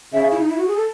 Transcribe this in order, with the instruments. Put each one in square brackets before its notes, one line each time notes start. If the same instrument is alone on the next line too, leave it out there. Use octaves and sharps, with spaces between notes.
[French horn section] C#3 [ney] E5
[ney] E4
D#4
E4
F#4
G#4
A4